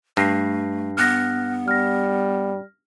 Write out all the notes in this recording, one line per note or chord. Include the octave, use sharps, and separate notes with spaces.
G2 A3 A#6 C7
B3 F6 F#6 A#6
G3 F6 A#6